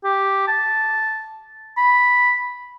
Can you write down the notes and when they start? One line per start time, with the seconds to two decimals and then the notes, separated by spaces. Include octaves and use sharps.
0.04 G4
0.48 A5
1.77 B5